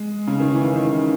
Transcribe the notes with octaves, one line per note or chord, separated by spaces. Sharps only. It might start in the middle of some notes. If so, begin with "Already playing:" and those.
Already playing: G#3
C#3
D#3
E3
D#3